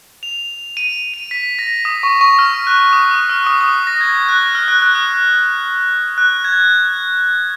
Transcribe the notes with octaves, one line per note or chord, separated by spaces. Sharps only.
F7
D#7
D#7
B6
A#6
D#6
C#6
C#6
F6
F#6
D#6
D#6
F6
D#6
D#6
A#6
G#6
F#6
F6
F#6
F#6
D#6
F#6
G#6